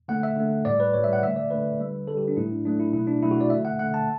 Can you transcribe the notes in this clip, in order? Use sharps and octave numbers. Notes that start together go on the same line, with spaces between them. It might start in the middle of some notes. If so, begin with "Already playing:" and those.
D3 A3 F#5
E5
D3 A3
A2 G3 D5
B4
A2 G3 C#5
E5
F#5
D3 A3 E5
D5
D3 A3 B4
D3 G3
D3 G3 A4
G4
D4
A2 F#3 A3 E4
D4
A2 F#3 A3 D4
E4
B2 F#3 A3 E4
D4
B2 F#3 A3 E4
F#4
D5
D3 A3 E5
F#5
D3 A3 F#5
A5